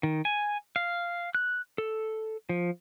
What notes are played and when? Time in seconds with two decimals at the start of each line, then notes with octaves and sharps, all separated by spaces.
0.03 D#3
0.25 G#5
0.76 F5
1.35 F#6
1.78 A4
2.49 F3